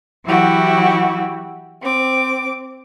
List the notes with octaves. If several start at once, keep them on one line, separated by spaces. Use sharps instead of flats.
E3 F#3 E4 F#4 G4
C4 D6